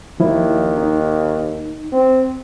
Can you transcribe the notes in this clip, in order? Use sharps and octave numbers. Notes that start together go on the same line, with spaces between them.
D#2 F3 E4
D#4
C4